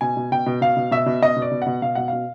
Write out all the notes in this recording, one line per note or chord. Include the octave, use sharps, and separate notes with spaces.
B2 G#5
B2
B2 G5
B2
B2 F5
B2
B2 E5
B2
B2 D#5
B2
D5
B2
B2 F#5
B2 F5
B2 F#5
B2 F5